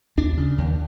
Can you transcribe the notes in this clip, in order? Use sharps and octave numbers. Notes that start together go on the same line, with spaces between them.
D#2 D4
C#3
D#2